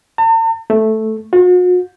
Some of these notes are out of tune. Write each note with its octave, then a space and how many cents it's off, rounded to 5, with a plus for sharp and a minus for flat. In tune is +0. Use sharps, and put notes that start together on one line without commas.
A5 +45
A3 -5
F#4 -45